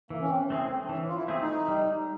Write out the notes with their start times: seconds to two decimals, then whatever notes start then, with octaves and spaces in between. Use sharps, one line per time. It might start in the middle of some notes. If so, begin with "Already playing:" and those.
0.10 E3 A#3
0.21 C#4
0.30 C4
0.50 A3 C4 E4 G#4
0.69 C4
0.85 D4
0.89 E3 C#4
1.08 F4
1.16 E4
1.28 A3 C4 E4 G#4
1.41 D#4
1.68 G3